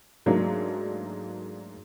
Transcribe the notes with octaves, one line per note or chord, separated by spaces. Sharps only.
G#2 F#3 A3 A#3 D4 D#4